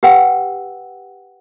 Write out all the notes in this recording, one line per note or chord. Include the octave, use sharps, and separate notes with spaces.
G4 B4 F#5 G5 E6